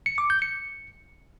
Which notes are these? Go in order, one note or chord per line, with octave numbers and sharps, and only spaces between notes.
C#7
D6
G6
C#7